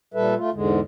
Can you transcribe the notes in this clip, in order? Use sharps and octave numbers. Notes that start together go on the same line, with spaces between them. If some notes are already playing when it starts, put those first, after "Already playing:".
A#2 G3 A4 B4 E5
A3 F4
E2 G#2 D3 G#3